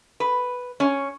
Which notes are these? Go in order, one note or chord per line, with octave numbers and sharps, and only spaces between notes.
B4
C#4